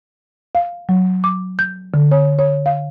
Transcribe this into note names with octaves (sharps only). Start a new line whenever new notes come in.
F5
F#3
D6
G6
D3
C#5
C#5
F5